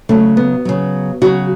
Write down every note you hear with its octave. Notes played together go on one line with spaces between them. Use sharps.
C#3 F#3 A3
B3
C#3 F#3
C#3 F#3 F#4